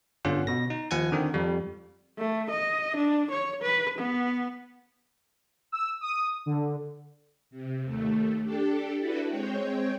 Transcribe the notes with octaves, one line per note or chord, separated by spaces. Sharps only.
G1 D3 C#4 F4 F#5
B2 A#6
D#4
D#2 F3 F#5 G#5 G#6
D3 D#3 C4
F2 G3
A3
D#5
D4
C#5
B4
B3
E6
D#6
D3
C3
D#2 A3
D4 G4 A4
D4 E4 F#4 A4 B4
G#3 C4 C#5 G5